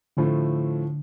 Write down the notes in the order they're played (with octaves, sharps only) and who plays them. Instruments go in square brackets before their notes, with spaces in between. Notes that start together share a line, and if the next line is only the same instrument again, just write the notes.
[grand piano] A2 F3 A3 [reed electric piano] D3